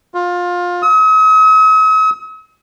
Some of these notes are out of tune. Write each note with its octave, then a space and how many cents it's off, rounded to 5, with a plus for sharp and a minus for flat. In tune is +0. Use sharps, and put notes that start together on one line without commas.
F4 +20
D#6 +45